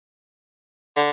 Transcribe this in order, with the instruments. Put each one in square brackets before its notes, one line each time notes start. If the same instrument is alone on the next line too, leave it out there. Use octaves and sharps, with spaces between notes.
[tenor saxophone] D3